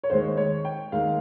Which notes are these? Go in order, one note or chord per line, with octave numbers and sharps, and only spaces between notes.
C#5
D#2 D#3 G#3 C5
C#5
G5
D#2 D#3 G#3 F5